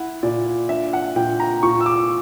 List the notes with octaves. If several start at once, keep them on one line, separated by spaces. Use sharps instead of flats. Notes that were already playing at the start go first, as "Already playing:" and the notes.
Already playing: E4 F#5
A#2 D5
D4 E5
F#5
A#2 G5
A#5
A#2 C#6
E6
D6